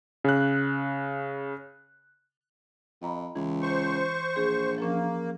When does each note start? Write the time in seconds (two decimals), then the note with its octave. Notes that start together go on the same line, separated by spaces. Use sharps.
0.24 C#3 F#6
3.02 F2 D#5 A#5 B5
3.35 C#2 E3
3.62 C5 C#6
4.36 A#1 G#4
4.78 F3 A#3 C#4